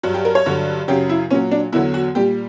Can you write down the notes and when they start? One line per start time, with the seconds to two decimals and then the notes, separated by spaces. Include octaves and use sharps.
0.03 G2 F#3 F#4
0.14 G4
0.25 A#4
0.35 C#5
0.46 G2 D3 F#3
0.88 F#2 C#3 F#3 G4
1.09 E4
1.30 A#2 C#4
1.34 F#3
1.52 D4
1.72 E2 D3 F#3 E4
1.94 F#4
2.15 A#2 G3 G4